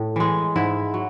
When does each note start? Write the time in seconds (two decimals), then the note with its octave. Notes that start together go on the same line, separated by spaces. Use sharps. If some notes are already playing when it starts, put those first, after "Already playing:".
Already playing: A2
0.16 E3 G#3
0.56 G#2 E4
0.94 F#3